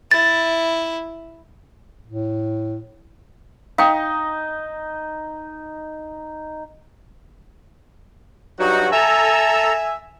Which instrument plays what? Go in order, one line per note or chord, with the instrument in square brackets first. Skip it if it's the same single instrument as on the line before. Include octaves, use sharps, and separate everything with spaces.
[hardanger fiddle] E4 [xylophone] A6
[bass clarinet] A2
[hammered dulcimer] D#4 [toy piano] F5 G5
[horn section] G2 F#3 F#4 [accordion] D#4
[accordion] A4 A#5 E6 [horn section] E5 G#5